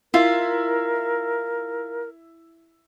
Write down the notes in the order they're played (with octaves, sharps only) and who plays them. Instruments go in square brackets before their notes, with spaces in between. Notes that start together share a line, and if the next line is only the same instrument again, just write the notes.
[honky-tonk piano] E4 [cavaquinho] F4 [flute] A#4